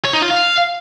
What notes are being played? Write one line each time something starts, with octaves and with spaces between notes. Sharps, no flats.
C#5
D#4
F4
F5